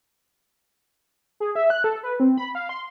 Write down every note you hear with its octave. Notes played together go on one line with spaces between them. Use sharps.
G#4
E5
F#6
A4
B4
C4
B5
F5
C6